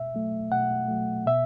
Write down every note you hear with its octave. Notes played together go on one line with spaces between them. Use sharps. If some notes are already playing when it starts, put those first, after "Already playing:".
Already playing: B2 E5
F#3 A3
B2 F#5
F#3 A3
B2 E5